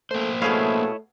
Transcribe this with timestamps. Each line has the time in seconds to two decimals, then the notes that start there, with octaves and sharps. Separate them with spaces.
0.11 A3 A#3 C5
0.42 B2 A3 E4 G#4 C#5 D#5 F5